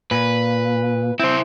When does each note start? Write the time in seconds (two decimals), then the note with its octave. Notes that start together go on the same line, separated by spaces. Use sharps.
0.11 A#2 B4
1.20 C4 E4 C5